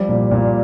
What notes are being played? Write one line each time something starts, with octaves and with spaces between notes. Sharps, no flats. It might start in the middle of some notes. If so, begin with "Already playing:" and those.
Already playing: F3 G3
A#2
A#2